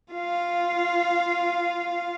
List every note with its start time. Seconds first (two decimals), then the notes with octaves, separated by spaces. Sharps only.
0.13 F4 F5